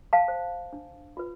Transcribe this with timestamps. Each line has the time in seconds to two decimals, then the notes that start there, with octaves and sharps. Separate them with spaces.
0.13 F5 A5
0.28 C5
0.73 D4
1.17 F4 B4